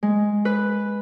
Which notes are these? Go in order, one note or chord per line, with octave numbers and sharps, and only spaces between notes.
G#3
B4